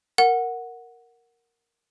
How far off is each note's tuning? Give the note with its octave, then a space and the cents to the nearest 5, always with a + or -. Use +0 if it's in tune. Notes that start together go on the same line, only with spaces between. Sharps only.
A#4 +0 F#5 -5